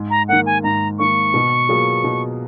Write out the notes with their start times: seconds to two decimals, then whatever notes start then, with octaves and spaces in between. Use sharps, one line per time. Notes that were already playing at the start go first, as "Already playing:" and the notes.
Already playing: G#2
0.10 A#5
0.28 D#3 A#3 F#5
0.46 G#5
0.63 G#2 A#5
0.99 D#3 A#3 C#6
1.34 B2
1.69 F#3 A#3 F4 G#4
2.04 B2